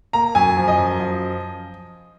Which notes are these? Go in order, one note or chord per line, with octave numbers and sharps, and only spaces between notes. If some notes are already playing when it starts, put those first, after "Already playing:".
A#3 A#5
F#2 G#5
F3
D#5
F#2
F3